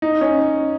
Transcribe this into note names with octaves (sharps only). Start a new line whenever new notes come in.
D#4
C#4